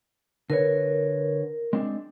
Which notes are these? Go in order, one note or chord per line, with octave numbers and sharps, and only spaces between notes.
D3 A#4 B4 C#5
G#3 C4 D4